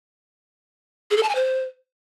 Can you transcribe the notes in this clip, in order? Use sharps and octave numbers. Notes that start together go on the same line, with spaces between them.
G#4
A4
A5
G#5
C5